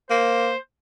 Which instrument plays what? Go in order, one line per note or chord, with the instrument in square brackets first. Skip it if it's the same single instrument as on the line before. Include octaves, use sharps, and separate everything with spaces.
[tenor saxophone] A#3 [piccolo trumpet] C5